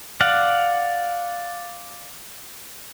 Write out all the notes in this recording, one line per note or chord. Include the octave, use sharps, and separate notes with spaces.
D5 F5 F#5